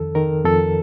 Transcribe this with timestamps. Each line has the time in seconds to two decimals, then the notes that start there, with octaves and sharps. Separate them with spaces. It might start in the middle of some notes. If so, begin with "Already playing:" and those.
Already playing: F2 D#3 A4
0.15 D#3 A#4
0.45 F2 A4